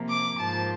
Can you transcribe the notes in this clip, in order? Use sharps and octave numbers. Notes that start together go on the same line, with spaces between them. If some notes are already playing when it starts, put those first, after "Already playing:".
Already playing: C3 F3 A#3
D6
G#2 F3 A#3 A5